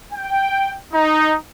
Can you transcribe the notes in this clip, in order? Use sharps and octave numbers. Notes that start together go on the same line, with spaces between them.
G5
D#4